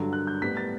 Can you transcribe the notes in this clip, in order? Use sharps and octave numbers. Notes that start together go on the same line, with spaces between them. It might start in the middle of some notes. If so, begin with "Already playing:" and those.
Already playing: G2 D3 F#3
F#6
G6
A2 G3 B3 B6
A6